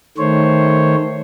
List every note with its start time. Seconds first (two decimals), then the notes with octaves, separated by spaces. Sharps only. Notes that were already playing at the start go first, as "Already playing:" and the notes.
0.18 D#3 A3 C5 C#5